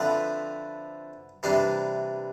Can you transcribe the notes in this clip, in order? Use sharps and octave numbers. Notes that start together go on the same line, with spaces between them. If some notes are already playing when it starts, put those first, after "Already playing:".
Already playing: D3 F3 A3 C4 B4 B5
C3 E3 G3 D4 C5 C6